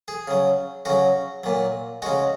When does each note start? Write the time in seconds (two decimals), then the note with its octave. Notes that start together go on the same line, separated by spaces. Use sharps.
0.08 G#4
0.27 C#3 F#3
0.85 C#3 F#3 F#4
1.44 A#2 F#3
2.02 C#3 G#3 F#4